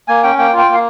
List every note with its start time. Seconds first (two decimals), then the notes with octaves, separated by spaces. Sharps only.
0.08 A#3 G#5
0.23 C#4 G5
0.38 A#3 G5
0.53 F4
0.58 G5
0.69 A#3 F5